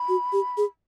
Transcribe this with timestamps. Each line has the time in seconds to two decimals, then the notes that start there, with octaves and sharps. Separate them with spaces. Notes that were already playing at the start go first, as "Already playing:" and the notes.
Already playing: B5
0.09 F#4
0.33 G4
0.57 G#4